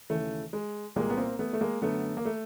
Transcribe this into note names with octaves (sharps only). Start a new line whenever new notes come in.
D#2 C#3 E3 A3
G#3
C2 A#2 G#3 A#3
B3
A#3 C4
A3 B3
A3
G#3 A#3
F#2 D3 A3 B3
A#3
A3